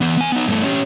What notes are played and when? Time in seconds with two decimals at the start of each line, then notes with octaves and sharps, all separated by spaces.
0.01 E3 B3
0.17 B3 G#5
0.32 B3 D#4
0.48 G2 A3
0.64 C#4 G4